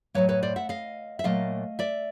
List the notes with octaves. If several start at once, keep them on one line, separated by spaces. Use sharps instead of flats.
A2 F#3 A#3 B4 C#5
B4 C#5
C5 D5
E5 F#5
D#5 F5
E5
A#2 F#3 A3 D#5 F5
D5 E5